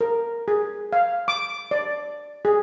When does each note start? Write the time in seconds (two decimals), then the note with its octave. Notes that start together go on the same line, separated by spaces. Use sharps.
0.01 A#4
0.48 G#4
0.93 F5
1.28 D6
1.71 D5
2.45 G#4